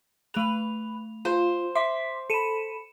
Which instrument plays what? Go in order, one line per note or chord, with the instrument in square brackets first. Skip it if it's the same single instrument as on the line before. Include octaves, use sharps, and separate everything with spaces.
[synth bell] A3 F7 [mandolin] B4
[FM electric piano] F4 [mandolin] C5
[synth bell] E5 [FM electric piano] C6 D6 B6
[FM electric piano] A4 B5 [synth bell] C#7 D#7 E7